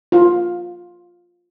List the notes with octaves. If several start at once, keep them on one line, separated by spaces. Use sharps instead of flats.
F4